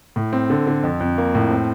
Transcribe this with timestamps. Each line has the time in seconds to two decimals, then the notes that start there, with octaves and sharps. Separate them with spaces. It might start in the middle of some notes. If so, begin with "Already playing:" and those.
0.16 A2
0.33 C4
0.50 D3
0.67 D3
0.83 F2
1.00 F2
1.18 A#3
1.35 A2
1.51 C4